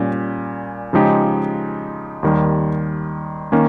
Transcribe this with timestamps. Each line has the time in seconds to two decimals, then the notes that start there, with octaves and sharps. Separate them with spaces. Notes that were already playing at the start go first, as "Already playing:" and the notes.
Already playing: A#2 G3 C#4
0.93 C#3 F3 G#3 D#4 G4
2.23 D#2 D#3 G3
3.52 D#3 A#3 C#4